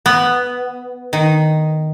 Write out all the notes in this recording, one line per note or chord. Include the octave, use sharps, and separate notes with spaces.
B3
D#3